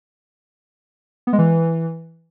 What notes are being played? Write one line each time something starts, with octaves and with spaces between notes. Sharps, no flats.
B3
G#3
E3